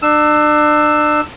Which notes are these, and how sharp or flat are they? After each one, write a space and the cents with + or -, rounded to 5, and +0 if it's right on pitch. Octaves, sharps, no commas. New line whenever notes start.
D4 +35 E6 +0